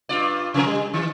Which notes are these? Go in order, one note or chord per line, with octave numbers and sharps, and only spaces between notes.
G2 F4 D5
C3 F3 A#4
G3
D#3